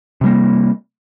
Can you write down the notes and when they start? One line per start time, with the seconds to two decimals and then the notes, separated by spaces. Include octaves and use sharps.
0.21 C3 G3 A#3